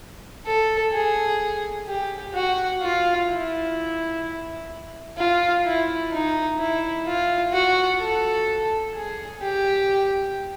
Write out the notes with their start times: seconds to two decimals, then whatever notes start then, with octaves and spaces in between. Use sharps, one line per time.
0.46 A4
0.93 G#4
1.87 G4
2.34 F#4
2.82 F4
3.29 E4
5.17 F4
5.65 E4
6.12 D#4
6.58 E4
7.06 F4
7.53 F#4
8.00 A4
8.95 G#4
9.42 G4